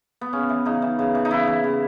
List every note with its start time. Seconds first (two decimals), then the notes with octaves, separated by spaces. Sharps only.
0.21 B3
0.33 C#3 C#4
0.49 E3
0.65 C#3 D#4
0.82 E3
0.99 C#3
1.15 E3
1.25 D#4
1.31 C#3 E4
1.47 E3
1.64 C#3